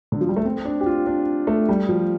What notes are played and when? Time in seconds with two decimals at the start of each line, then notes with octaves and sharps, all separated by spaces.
0.12 D3
0.21 F3
0.29 G3
0.36 A3
0.45 C4
0.65 D4
0.81 G4
0.86 F4
1.07 D4
1.47 A3
1.69 G3
1.89 F3